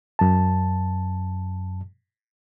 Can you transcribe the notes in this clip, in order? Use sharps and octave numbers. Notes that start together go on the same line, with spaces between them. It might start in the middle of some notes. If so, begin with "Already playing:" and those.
F#2 A5